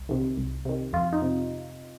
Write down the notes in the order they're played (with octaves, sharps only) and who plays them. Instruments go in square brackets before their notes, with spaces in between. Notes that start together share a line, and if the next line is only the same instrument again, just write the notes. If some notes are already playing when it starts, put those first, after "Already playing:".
Already playing: [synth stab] C2
C3 D#3
C2
C3 D#3
F2 F4
D#4
C3